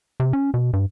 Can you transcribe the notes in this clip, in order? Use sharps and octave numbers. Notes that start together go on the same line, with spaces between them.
C3
C#4
B2
G2